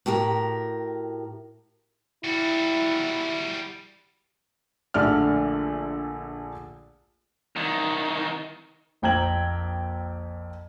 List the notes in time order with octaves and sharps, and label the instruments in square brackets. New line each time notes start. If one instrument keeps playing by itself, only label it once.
[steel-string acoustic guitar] A2 F#4 G4 A#4
[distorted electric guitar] G3 F#4 [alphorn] E4
[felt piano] A#1 D3 A3 D5 F6
[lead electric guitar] C2 D#3
[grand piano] A#1 F2 G5 A#5 G#6 F#7